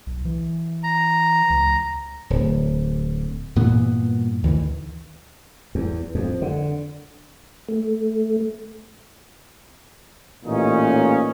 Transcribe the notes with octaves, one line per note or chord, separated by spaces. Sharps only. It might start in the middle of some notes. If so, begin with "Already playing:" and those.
B1
E3
A#5
C#2
D1
G2 A#2 E3 B3
D2 D#3 E3
E2
F2
D3
A3
A1 A#2 C#4 D#4